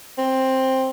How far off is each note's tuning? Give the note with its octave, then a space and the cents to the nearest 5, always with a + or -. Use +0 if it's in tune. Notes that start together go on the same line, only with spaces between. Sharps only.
C4 +10